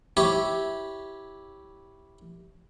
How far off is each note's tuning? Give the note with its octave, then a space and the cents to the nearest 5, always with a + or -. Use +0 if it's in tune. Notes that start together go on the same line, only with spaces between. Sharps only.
E4 -10 G4 -5 C#5 +0